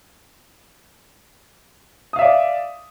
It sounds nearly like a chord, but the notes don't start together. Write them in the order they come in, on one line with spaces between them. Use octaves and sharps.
D#6 F5 E5 D5